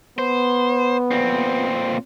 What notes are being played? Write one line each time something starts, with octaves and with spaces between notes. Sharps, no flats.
B3 C5
A#2 C4